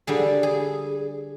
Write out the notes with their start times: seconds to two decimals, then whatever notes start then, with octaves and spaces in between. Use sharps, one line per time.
0.07 D3 G3 G#4
0.43 G#4